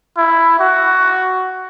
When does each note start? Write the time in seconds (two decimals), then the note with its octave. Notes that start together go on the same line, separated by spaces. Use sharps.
0.17 E4
0.59 F#4